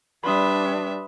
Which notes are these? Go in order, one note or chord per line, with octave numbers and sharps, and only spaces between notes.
G3 D4 B4 E5 B5 C6 D#6